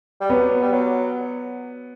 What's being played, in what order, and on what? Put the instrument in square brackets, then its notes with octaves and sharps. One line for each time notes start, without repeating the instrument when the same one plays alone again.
[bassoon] G3
[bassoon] F#3 [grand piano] B3
[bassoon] G3
F#3